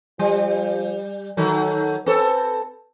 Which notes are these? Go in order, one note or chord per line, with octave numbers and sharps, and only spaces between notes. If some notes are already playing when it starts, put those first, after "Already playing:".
F3 G3
D#3 F#3 A4
C4 A4 B4